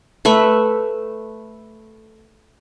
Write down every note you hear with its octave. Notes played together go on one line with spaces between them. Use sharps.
A3 B4 E5